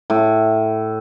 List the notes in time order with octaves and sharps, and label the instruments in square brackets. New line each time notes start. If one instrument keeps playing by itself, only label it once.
[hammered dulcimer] A2